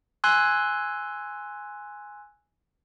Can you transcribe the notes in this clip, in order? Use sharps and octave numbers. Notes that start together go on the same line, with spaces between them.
G#5 C6 E6 F#6 G#6